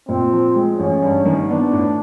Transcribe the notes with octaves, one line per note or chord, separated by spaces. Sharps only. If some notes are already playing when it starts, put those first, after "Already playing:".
A#2 C4
F3
G#3
A1 C#4
G2
D#3
B3 D4
A2